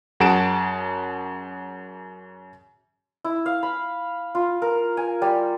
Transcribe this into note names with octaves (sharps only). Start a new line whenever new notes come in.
F#2 F#4 G#4 A5 D7 E7
E4
F5
B5
F4
A#4
G#5
G3